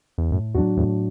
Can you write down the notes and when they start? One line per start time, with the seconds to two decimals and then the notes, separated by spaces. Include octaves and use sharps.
0.18 E2
0.32 F#2 A2
0.55 E2 F#4
0.58 F#3 D4
0.77 E2 A2